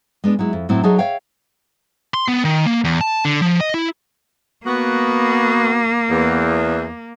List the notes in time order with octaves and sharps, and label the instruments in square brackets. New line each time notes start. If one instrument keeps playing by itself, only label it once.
[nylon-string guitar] G#3 B3 D4
F#3 G#3 E4
F2
A2 F#3 C4 E4
F#3 D#4 G#4 A4
C#5 E5 F5 G5
[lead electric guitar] C6
B3
D#3
A#3
E2
A5
D3
F3
D#5
E4
[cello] A#3 [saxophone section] B3 F#4
[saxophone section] E2